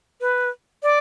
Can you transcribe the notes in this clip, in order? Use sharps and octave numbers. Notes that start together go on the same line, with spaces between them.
B4
D5